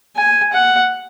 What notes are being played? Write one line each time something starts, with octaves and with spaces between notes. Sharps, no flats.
G#5
F#5